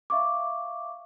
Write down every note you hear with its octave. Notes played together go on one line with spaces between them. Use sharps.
E5 F5 C#6 D6